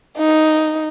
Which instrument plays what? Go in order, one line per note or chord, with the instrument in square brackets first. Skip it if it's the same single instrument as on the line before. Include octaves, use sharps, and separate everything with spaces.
[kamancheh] D#4